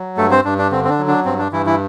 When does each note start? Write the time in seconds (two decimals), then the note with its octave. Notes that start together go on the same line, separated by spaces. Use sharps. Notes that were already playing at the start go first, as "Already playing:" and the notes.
Already playing: F#3
0.17 G2 A3 A4
0.31 C4 C5
0.45 G2 D4
0.58 D4
0.71 D3 C4
0.85 C4
0.89 D4
0.99 F#3
1.08 D4
1.25 G2 C4
1.39 D4
1.52 G2 E3 E4
1.66 E3 E4